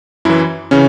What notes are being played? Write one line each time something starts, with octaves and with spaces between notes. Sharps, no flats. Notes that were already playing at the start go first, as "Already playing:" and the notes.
F#2 E3 E4
C#3 E3 C#4